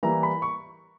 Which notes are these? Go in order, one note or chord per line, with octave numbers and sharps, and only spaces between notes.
E3 G3 A#3 E4 A#5
B5
C#6